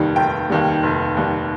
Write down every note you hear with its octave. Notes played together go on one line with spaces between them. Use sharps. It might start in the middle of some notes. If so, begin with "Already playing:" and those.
Already playing: F1 D#2 D#3 G3
F1 G5
D#2 D#3 G3
F1
D#2 D#3 G3